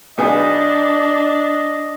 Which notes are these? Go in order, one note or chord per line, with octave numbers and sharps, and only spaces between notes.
B1 B3 D4 G#4 D#5